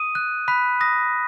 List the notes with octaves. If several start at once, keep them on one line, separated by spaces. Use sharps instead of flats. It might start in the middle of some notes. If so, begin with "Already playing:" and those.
Already playing: D#6 D#7
F#6
B5 F#6 B6
D#6 A#6